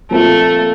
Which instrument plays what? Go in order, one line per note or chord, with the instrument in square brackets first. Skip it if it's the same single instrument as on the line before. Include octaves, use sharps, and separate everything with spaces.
[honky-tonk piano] A#2 F3 C4 F4 A#4 [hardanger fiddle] A3